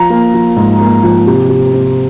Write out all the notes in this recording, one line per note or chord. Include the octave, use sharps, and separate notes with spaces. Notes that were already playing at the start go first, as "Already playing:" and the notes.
Already playing: F3 A#5
A#3
F3
G#2
A#3
F3
C3
C3
C4